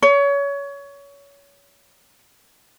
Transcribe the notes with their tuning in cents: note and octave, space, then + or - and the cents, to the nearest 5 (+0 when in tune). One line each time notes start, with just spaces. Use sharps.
C#5 +25